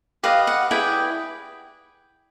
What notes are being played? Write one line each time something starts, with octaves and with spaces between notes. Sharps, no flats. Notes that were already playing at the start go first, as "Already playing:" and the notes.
G4 B4 D#5 F5
F#5
E4 G#4 B4 D5 G5